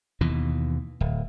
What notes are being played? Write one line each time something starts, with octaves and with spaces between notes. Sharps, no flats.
D#2 B2 E3
D1